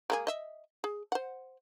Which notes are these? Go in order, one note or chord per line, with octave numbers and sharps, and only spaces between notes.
G#3 A#3 G#4
D#5 E5
G#4
C5 F#5